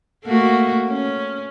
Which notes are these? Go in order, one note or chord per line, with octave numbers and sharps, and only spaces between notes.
A3 A#3 F#4
C#4